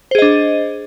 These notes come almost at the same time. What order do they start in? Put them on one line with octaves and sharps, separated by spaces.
C5 G#4 D#5 D4